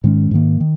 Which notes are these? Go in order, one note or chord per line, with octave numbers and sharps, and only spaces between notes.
G#2 D#3 G#3 C#4
G#2 D#3 A#3
D#3